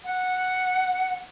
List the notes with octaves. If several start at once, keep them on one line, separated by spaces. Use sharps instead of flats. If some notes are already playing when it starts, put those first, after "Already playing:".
F#5